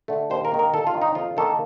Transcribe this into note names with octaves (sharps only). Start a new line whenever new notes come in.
D3 A3
D#2 C5
A#4
D#3 A#3
A#4
D#2 A4
F4
D#3 A#3
D#4
F2 F4
D#3 A#3 A4